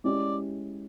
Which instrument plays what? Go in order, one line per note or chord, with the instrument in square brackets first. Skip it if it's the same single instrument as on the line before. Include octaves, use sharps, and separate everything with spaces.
[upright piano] G#3 C#4 E4 G4 [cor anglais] D5